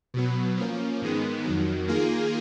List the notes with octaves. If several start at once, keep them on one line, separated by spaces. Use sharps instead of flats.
B2 F#3 B3
F3 A#3 C#4
G#2 D#3 G#3 B3
F2 D#3 F#3
D#3 A#3 F4 G#4